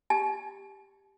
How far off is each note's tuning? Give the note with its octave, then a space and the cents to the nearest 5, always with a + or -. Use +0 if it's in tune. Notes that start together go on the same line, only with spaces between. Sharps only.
G4 +5 A5 -45